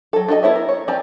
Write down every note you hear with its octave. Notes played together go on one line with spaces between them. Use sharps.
F#3 A4
D4 F#4 A4 A#4 D#5
B3 E4 C#5 E5
A#4
C#5
F3 C4 D5 G#5 A#5